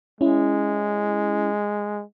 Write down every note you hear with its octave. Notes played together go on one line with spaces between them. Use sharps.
G#3 C#4 E4